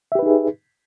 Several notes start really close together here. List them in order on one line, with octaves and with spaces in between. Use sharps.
E5 G4 B4 D#4 G#4